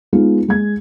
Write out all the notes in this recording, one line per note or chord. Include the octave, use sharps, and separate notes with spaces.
G#3 B3 D#4 F4
G#3 G#6